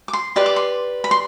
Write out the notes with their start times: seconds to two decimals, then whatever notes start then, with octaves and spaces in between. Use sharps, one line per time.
0.08 D6
0.13 C6
0.36 G4 B4 D5 C6
0.46 D6
0.56 C6
1.04 B5
1.11 C6